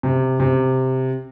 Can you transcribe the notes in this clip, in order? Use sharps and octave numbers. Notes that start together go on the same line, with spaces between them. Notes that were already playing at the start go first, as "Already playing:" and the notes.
C3
C3